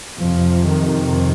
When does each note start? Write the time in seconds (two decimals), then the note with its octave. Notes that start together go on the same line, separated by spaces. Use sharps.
0.21 F2 C3 F3
0.69 D#3